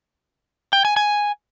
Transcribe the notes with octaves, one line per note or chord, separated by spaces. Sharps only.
G5
G#5
G#5